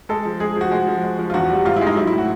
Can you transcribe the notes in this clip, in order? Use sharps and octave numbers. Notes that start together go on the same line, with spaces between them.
G#3 A4
F3
G#3 G#4
F3 F#4
G#3
F3
G#3
F3
F4
E2 F#4
G3
G#2 F4
E4
G#3
D#4
F#3 E4
E4
A2
F#4